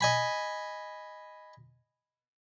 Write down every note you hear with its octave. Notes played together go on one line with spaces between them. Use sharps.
D#5 G#5 B5